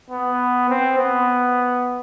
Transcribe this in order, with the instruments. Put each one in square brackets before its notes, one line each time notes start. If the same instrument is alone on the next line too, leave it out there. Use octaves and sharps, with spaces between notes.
[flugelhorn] B3
C4
B3